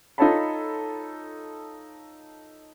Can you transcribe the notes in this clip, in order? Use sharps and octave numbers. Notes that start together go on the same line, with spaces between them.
D#4 F4 A4 C#5 A5 B5